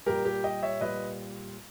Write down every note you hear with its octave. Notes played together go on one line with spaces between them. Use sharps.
A#2 G3 G4 A#4
G4 A#4
D#5 G5
C#5 E5
A#2 G3 B4 D#5